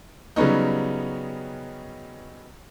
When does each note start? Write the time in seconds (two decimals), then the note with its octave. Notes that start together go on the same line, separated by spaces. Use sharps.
0.36 C#3 F#3 G3 B3 C#4 D#4